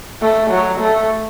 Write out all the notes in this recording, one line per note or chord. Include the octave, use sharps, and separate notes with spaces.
A3
F#3
A3